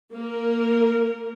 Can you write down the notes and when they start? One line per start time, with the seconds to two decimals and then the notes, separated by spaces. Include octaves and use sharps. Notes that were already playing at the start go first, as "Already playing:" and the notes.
0.14 A#3 A#4